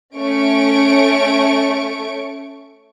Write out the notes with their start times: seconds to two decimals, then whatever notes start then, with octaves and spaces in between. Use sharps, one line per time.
0.16 A3 C#4 C#5 C#6 D7